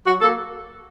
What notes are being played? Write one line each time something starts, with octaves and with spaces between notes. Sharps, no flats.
F#3 F#4
A#3 A4